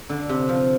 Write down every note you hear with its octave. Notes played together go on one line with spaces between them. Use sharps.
D3
C3
F3